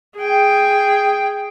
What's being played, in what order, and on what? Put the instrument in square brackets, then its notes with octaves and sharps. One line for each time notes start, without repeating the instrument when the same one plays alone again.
[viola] G#4 G5